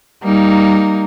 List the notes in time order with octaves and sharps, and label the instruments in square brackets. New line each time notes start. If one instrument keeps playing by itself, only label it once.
[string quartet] G3 A#3 D#4